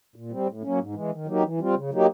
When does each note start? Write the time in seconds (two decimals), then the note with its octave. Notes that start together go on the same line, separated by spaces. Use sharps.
0.16 A#2
0.32 G3 C4
0.47 A2
0.63 F#3 A#3 C#4
0.79 G#2
0.95 E3 G#3
1.11 D#3
1.26 F#3 A#3 D#4 G4
1.43 E3
1.59 G3 C4 F4
1.74 C#3
1.90 F#3 A#3 D#4 G4